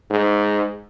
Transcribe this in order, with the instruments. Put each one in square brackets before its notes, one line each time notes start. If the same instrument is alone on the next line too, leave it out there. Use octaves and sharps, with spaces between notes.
[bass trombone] G#2